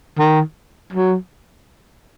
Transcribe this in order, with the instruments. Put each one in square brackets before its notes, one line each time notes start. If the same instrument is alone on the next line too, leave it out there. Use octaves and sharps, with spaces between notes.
[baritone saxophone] D#3
F#3